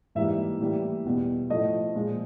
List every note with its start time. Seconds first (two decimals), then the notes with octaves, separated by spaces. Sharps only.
0.15 G#2 E3 G3 A#3 E5
0.60 A2 E3 G3 A#3
1.05 E2 B2 G3
1.50 A2 F3 A3 D#5
1.95 A#2 F3 G#3